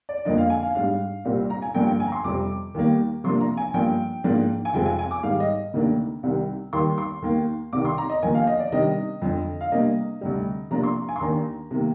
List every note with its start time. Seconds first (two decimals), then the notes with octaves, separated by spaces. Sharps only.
0.09 D5
0.25 F2 D3 F3 A#3 D4 D#5
0.38 F5
0.50 G#5
0.63 F5
0.75 G#2 G3 D4 F5
1.25 C2 A#2 G3 C4
1.50 A#5
1.62 G#5
1.74 G2 D3 F3 A#3 D4 G5
1.87 G5
2.00 G#5
2.07 A#5
2.12 C6
2.24 F2 C3 G3 C4 D6
2.74 D#2 D#3 G3 A#3
3.24 C3 F3 A#3 D4 C6
3.41 A#5
3.57 G#5
3.74 G2 F3 A#3 G5
4.24 G#2 F3 A#3 D4
4.65 G#5
4.74 F2 C3 F3 G#3 C4 G5
4.86 G#5
4.99 G#5
5.11 D6
5.23 G#2 D#3 G3 F5
5.40 D#5
5.73 D2 C3 D#3 A#3 D4
6.23 C2 C3 D#3 G3
6.73 D#2 D#3 G3 C6
6.98 C6
7.22 D#2 D#3 A#3
7.73 C2 C3 D#3 D6
7.85 C6
7.98 A#5
8.09 D#5
8.22 D#2 D3 F3 A#3 G#5
8.35 F5
8.47 D#5
8.59 D5
8.72 C3 D#3 G3 D4 D#5
9.22 F2 D3 F3
9.61 F5
9.72 C3 G3 A#3 D4 D#5
10.21 D2 C3 G3
10.71 C3 F3 A#3 D4 A#5
10.83 C6
11.08 G#5
11.16 C6
11.21 D#2 D#3 A#3 D4 A#5
11.71 C3 D#3 A#3